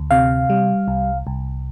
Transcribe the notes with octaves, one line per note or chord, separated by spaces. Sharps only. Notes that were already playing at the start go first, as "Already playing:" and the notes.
Already playing: D2
C3 F5
G3
C2
C2